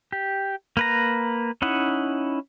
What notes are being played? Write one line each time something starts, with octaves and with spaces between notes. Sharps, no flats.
G4
A#3 B4 A#5
C#4 D#4 E4 F#5